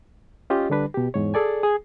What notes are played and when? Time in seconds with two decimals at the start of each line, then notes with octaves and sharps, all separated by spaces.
0.50 C#4 F4 G4 D#5
0.70 D3 G3 D4 B4
0.94 B2 G4
1.14 E2 G#2 C#5
1.34 G#4 A4 D5 G#5
1.63 G#4